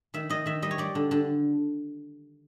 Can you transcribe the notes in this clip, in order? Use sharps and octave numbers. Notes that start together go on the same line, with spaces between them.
D#3 E5
D#3 D#5
D#3 E5
G3 D#5
C#5
G3 D5
D3
D3